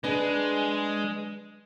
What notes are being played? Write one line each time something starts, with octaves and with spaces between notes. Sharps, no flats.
G#3 D4 G#4 B4